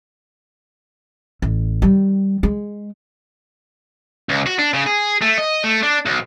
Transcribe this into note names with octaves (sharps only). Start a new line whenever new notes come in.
A1
D#3 G3
G#3
C#2
F#4
D4
C#3
G#4
A3
D#5
A3
D4
B1